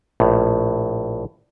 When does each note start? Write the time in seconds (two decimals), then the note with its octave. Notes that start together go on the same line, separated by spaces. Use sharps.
0.20 A#1 A2